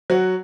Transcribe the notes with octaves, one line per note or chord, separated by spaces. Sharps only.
F#3 F#4